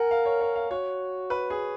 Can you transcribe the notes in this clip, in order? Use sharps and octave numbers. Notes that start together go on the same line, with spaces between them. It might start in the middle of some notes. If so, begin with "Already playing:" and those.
Already playing: A#4 F#5 G#5
F5
C#5
C#5
F5
F#4 C#5
B4
G#4